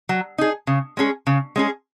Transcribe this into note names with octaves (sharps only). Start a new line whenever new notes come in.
F#3
D#4 G#4
C#3
G#3 C#4 G#4
C#3
G#3 C#4 G#4